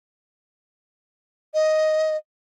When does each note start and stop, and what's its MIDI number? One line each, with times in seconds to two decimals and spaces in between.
1.54 2.17 75